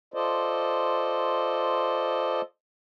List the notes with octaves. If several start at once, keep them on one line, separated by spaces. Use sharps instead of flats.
F4 A4 C5 D5 D#5